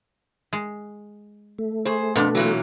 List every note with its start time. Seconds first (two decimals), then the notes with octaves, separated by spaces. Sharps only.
0.53 G#3
1.59 A3
1.85 G#4 C5
2.16 F2 B2 D4
2.35 A#2 E3 F#3